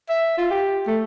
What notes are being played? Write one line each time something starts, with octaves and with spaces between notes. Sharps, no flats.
E5
F4
G4
A3